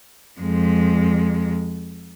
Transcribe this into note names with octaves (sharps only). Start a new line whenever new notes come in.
F2 G#3